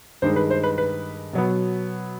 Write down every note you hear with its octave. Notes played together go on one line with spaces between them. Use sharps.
G2 D#3 G#3 C5
B4
C5
B4
B4
B2 F#3 B3